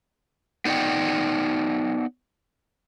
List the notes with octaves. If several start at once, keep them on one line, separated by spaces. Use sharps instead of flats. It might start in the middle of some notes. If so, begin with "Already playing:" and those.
B3 D#4 D5 F#5 G5